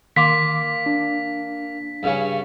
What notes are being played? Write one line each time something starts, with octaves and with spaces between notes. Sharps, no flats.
D#3 A#3 C6 D6 B6
D4
G2 C#3 C#4